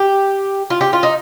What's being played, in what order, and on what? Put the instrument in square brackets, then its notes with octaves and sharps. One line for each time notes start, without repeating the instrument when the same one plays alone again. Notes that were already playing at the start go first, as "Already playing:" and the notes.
Already playing: [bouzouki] G4
F4
G4
F4
D#4